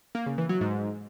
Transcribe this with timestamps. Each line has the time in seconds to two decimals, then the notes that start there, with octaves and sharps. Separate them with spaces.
0.15 A#3
0.26 C#3
0.38 E3
0.49 F#3
0.61 G#2